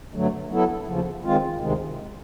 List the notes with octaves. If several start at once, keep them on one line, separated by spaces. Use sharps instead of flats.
G2 D3 F#3 A3
F#3 B3 E4 A4
D#2 C#3 F3
D#3 G#3 C4 F4
D2 C3 D#3 G#3